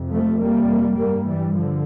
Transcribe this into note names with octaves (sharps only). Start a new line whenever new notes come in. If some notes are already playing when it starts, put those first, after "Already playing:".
Already playing: F2 C3
F3 A3
G3 A#3
G2 G3 A#3
E3 G3
D3 F3